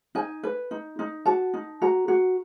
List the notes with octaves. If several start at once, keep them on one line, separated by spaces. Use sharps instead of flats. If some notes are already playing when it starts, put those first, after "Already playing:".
D#4 G#5
B4
D#4
D#4
F#4 A5
D#4
F#4 A#5
F#4